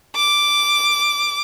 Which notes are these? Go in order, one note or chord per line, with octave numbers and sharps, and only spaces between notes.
D6